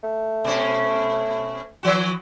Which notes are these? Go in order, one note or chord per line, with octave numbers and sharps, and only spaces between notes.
A3
B2 C#4
E3 F3 F#4